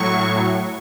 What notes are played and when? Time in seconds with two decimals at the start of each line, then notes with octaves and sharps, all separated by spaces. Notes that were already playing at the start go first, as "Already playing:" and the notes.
Already playing: A2 F#3 C#6